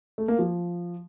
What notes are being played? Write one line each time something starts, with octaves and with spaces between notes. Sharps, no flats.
A3
A#3
F3